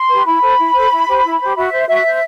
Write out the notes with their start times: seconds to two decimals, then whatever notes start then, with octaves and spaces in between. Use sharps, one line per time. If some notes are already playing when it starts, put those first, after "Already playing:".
Already playing: C6
0.09 G4 B4
0.25 E4 B5
0.42 A4 C5
0.58 E4
0.74 A4 C5
0.91 E4
1.07 G4 C5
1.23 E4
1.40 G4 C5
1.56 F#4 E5
1.73 C5
1.88 F#4 E5
2.05 C5